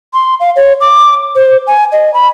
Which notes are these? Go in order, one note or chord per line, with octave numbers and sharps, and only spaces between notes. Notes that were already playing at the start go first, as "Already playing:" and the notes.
C6
F5
C#5
D6
C5
G#5
D#5
B5